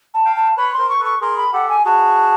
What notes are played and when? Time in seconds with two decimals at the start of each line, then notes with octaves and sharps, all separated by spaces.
0.14 A5
0.25 F5 G5
0.36 A5
0.57 B4 C#5 B5
0.73 C6
0.78 A#4 C5
0.89 C#6
1.00 A4 B4
1.05 C#6
1.21 G#4 A#4 C6
1.37 B5
1.53 G4 A4 F#5
1.69 G#5
1.85 F#4 G#4 A5